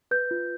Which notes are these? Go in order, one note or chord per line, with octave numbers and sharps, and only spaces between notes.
B4 G6
F4